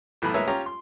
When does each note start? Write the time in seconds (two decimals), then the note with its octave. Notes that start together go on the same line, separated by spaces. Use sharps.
0.22 B1 A2 E3 A3 B5
0.34 G#3 A#3 B4 C#5 E5 A#5
0.47 C#4 F4 G4 C#5 A#5
0.66 C6